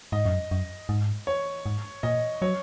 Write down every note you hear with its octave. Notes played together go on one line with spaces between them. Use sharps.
G#2 D#5
F#2
F#2
G#2
C#5
G#2
A#2 D#5
F#3 C#5